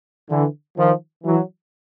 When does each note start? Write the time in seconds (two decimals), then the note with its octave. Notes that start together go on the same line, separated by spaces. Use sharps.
0.29 D3 E3
0.77 D#3 F3
1.23 E3 F#3